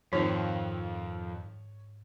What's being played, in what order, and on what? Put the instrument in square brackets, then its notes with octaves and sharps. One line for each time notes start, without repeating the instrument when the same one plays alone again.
[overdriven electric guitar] F2 [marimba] G#2 [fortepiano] D#3 F3 [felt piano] C#5